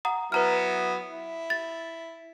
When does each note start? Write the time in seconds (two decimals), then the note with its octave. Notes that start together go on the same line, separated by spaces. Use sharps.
0.05 F#5 A#5 D#6
0.32 F#3 B3 E4 B4 A#5 F6
1.10 E4
1.50 A6